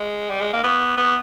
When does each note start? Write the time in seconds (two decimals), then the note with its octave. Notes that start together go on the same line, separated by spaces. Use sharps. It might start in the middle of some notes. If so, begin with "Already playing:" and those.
Already playing: G#3
0.30 G3
0.41 G#3
0.53 A#3
0.64 B3
0.98 B3